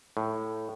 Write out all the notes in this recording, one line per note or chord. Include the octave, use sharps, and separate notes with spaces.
A2